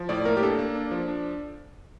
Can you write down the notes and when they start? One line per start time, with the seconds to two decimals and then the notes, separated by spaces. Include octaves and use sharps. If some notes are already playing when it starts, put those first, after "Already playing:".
Already playing: F3
0.09 A2 D5
0.25 A#3 A#4
0.37 G4
0.42 D4 A4
0.59 A#3
0.75 D4
0.91 F3
1.08 D4